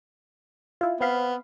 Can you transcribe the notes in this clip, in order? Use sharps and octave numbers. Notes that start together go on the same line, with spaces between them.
E4 F4
B3 C4 F5 B5